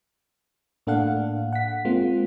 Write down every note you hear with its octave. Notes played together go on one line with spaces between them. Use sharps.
A2 A#3 D4 A4 F5 F#5
F#5 B6
G#3 A#3 C4 F4